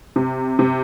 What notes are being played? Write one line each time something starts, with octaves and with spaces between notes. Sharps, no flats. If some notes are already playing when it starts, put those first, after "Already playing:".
C3
C3